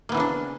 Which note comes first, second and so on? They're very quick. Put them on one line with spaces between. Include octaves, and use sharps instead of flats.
A#3 B3 E3 C#3 D4